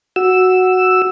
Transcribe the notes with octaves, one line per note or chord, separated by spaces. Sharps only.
F#4 E6